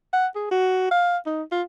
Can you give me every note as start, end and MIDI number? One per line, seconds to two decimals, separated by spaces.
0.13 0.27 78
0.36 0.50 68
0.51 0.91 66
0.91 1.17 77
1.26 1.43 63
1.52 1.62 65